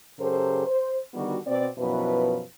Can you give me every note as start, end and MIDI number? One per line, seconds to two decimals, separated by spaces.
0.19 0.65 42
0.19 0.65 49
0.19 0.65 67
0.19 0.65 69
0.19 0.65 70
0.19 0.65 72
0.66 0.97 72
1.13 1.36 50
1.13 1.36 51
1.13 1.36 55
1.13 1.36 59
1.13 1.36 66
1.46 1.67 47
1.46 1.67 60
1.46 1.67 74
1.78 2.40 42
1.78 2.40 47
1.78 2.40 53
1.78 2.40 64
1.78 2.40 71